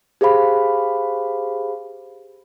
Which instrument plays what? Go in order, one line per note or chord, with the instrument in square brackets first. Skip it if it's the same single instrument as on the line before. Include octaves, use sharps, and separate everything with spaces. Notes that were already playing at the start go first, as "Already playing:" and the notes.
[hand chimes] G4 G#4 C5 F5 B5